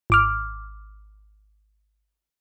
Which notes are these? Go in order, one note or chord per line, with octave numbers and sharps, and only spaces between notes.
G#1 D6 F6